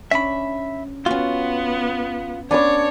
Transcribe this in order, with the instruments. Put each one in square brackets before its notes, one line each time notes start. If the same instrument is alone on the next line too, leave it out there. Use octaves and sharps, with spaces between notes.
[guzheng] C#4 D4 [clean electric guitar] E5 B5
[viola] B3 [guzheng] C#4 F#4 [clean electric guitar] F4
[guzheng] B3 C#4 [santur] D4 D6 [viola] C#5